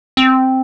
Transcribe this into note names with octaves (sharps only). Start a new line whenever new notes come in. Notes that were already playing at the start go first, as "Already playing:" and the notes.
C4